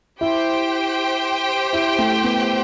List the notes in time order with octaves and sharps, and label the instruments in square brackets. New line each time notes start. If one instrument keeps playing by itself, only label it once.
[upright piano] E4 [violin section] G4 C5 G5
[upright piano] E4
A3
B3